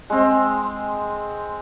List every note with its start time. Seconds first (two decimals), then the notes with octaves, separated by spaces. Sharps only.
0.10 G#3 C4